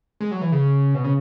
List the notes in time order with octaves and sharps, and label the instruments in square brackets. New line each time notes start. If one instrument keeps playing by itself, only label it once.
[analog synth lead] G#3
F#3
E3
C#3
B2
C#3